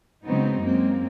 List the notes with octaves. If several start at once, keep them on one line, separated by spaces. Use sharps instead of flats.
C#3 F#3 G#3 B3 C4 D#4
F#2 G#3 A#3 C4